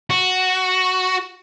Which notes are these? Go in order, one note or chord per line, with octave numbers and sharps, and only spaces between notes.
F#4